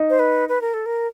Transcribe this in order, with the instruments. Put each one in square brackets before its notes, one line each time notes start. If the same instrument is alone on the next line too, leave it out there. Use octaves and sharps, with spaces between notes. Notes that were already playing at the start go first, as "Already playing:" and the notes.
Already playing: [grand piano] D#4
[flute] C5
B4
B4
A#4
A4
A#4